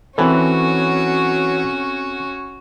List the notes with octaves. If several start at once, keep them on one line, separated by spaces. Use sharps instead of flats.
E3 F#3 C4 C#4 F#4 A4